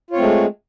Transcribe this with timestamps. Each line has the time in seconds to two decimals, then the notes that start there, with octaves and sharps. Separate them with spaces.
0.10 F4
0.13 C#5
0.16 C4
0.19 A3
0.21 G#3